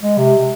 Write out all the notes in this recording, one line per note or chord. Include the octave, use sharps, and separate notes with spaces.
G#3
C3